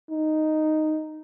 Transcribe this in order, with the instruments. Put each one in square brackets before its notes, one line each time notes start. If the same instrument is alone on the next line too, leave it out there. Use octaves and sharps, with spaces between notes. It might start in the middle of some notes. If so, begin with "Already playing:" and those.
[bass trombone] D#4